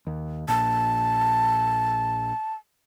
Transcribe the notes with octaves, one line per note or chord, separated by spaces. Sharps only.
D#2
A#1 A#2 A5